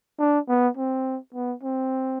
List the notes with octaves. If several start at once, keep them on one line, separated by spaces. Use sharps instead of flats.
D4
B3
C4
B3
C4